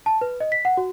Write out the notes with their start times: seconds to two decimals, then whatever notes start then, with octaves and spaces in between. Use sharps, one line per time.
0.06 A5
0.21 B4
0.40 D#5
0.52 B6
0.65 F#5
0.77 F#4